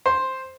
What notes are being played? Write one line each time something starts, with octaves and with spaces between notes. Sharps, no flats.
C5